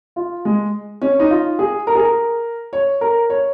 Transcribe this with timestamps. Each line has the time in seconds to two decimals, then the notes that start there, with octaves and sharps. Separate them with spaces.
0.16 F4
0.45 G#3
1.02 C#4
1.20 D#4
1.31 F4
1.59 G#4
1.87 A#4
1.95 G#4
2.02 A#4
2.73 C#5
3.01 A#4
3.30 C#5